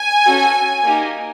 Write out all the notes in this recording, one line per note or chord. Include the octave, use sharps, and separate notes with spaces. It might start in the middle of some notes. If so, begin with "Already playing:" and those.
Already playing: G#5
C#4 F#4 A4
A#3 D#4 G4